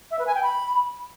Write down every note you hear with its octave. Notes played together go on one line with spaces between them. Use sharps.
E5
B4
G#5
G5
B5